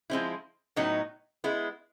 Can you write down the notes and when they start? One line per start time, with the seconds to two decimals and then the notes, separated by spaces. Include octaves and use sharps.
0.10 F3 G#3 C4 E4
0.76 A2 F#3 B3 D#4
1.44 G#3 B3 E4